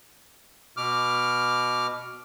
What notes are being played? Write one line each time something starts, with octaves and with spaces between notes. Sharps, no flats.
B2 D6 F6